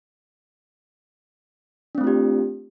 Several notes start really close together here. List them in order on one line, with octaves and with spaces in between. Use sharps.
D4 C4 A3 F4 G4